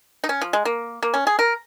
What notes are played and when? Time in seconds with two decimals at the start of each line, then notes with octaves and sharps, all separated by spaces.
0.24 D#4
0.29 C#4
0.41 F3
0.53 G#3
0.65 A#3
1.03 A#3
1.14 C#4
1.27 G#4
1.39 A#4